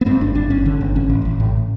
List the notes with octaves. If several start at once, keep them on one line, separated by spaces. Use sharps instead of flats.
B3
G2 C4
G1 D4
G1 D4
G1 C#4
D3
G1
A1 C#4
A1
A1
A2